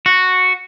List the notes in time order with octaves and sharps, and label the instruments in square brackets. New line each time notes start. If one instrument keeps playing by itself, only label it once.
[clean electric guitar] F#4